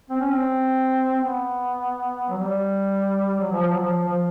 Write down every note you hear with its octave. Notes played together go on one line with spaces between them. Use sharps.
C4
C#4
C4
B3
F#3
G3
F#3
F3
F#3
F3
F3